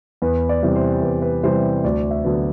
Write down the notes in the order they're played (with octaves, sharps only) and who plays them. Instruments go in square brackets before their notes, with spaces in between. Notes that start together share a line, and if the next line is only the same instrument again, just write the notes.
[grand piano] E2 B4
D5
C3 E3 G3 C4
C5
E2 B4
B4
C3 E3 G3 C4 C5
D2 D5
E5
D3 F#3 B3